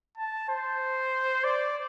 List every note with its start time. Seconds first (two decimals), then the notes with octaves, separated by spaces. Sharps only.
0.18 A5
0.49 C5
1.44 D5